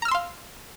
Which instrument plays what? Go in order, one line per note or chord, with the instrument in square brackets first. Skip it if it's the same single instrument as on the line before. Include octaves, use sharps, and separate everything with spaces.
[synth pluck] A#5
F6
E6
C6
F5